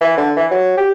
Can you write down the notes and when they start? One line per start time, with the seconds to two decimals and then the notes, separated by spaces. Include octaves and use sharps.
0.01 E3
0.17 D3
0.36 E3
0.51 F#3
0.77 G4